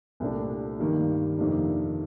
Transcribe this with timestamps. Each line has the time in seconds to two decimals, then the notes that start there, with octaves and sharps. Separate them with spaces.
0.20 C2 A#2 A3 D4
0.79 G2 D#3 G3 A#3
1.38 F2 C3 D#3 A#3 D4